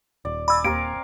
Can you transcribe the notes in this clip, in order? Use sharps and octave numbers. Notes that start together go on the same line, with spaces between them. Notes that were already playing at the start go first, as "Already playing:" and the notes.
D#1 D5
D5 G#5 B5 E6
D#2 C4 A#4 F5 D7